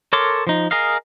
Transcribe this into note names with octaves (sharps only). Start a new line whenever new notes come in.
A4 A#4 C#5 C6 D6
F3 D#4
G#4 A#4 D#5 F5